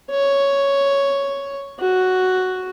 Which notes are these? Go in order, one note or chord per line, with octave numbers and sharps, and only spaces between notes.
C#5
F#4